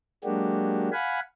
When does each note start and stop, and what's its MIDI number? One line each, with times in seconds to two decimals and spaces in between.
0.24 0.90 54
0.24 0.90 56
0.24 0.90 58
0.24 0.90 62
0.24 0.90 66
0.24 0.90 67
0.93 1.20 77
0.93 1.20 78
0.93 1.20 80
0.93 1.20 83